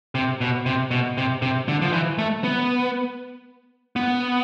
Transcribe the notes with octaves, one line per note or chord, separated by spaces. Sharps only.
C3
B2
C3
B2
C3
C3
D3
F3
E3
A3
B3
B3